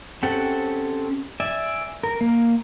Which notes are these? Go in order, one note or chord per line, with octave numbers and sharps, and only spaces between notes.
C4 C#4 G4 A4 F#5
D5 E5 G#5
A#4
A#3